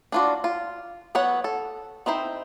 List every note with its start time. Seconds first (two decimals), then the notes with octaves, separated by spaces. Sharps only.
0.12 D4 F4 F#4
0.44 F4
1.15 F#3 B3 C#5 F#5
1.44 A4
2.06 C4 D#4 E4 C5